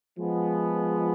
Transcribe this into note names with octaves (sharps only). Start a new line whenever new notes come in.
F3 G#3 B3